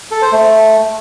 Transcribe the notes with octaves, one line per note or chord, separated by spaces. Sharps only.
A4
C5
A3